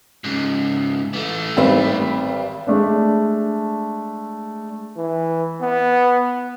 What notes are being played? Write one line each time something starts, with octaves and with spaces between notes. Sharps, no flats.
G#2 C#3
E3 A3
G#1 G3 C4 B4
G#3 A3 D4
E3
B3